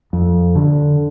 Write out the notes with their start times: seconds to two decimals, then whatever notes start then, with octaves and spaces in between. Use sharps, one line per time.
0.13 F2
0.55 D3